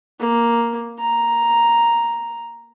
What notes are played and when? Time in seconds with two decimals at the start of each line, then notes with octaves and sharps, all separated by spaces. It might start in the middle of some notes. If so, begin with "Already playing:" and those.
0.20 A#3
1.00 A#5